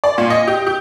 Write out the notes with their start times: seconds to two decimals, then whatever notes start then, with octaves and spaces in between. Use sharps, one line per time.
0.04 D5
0.18 A#2
0.30 D#5
0.48 G4
0.67 G4